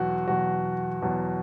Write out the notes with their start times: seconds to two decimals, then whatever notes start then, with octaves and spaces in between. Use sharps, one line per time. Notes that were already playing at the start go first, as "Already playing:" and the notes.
Already playing: E2 B2 F#3 F#4
0.28 E2 B2 F#3 F#4
1.02 E2 B2 F#3